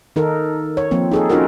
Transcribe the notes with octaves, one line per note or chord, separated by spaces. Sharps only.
D#3 D#4 A4 A#4
C#5
F3 A#3 C4
D#4 G#4 A4
C#4 D#4 F4 F#4 A#4